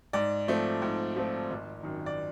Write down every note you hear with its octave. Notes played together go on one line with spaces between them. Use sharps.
G#2 D5
F3 A3 C4
G#2
F3 A3 C4
G#1
F#2 D#3
D5